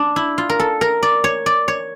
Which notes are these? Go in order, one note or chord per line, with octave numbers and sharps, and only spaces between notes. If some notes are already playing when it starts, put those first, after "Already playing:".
Already playing: D4
E4
F4
A#4
A4
A#4
D5
C#5
D5
C#5